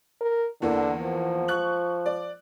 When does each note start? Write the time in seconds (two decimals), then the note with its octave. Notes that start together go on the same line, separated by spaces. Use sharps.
0.21 A#4
0.62 E2 D3 E3 A#3
1.01 F3
1.48 C#6 F#6 F#7
2.06 D5